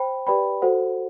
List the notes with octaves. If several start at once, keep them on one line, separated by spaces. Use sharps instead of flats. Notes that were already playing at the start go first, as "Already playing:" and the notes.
Already playing: C5 G5 B5
G4 B4 D5 G5 B5
F#4 A4 C5 F#5